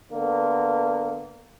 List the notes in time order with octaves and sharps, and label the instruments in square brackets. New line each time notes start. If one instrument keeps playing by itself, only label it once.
[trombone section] D3 A#3 B3